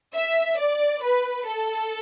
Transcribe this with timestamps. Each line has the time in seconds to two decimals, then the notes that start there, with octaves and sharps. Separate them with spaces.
0.14 E5
0.59 D5
1.03 B4
1.46 A4